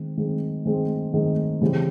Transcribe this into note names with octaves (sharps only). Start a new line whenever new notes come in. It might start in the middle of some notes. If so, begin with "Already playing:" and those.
Already playing: D#3 G#3 C4
D#3 G#3 C4
D#3 G#3 C4
D#3 G#3 C4
C#3 E3 G3 C4